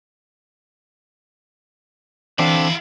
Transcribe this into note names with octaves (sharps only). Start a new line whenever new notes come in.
D3 E3 C4 D4 E4 F5